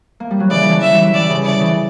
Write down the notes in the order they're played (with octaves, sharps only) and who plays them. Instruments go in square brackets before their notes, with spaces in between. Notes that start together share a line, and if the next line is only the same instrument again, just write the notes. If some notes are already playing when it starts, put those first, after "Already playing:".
[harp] A#3
G3
F#3
[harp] C#3 E3 [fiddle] D5
[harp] E3
D3 F#3
[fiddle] E5
[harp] E3 G3
[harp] E3 G3 [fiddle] D5
[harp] C#3
E3
[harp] D3 [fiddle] D5
[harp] C#3 E3